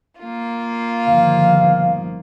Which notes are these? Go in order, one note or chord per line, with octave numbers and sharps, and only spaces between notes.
A#3 F4
G1 D#3 F3 F5